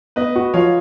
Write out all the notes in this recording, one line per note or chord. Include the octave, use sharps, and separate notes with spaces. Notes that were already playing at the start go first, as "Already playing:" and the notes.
B3 B4 D#5
F#4
F3 C#5 F5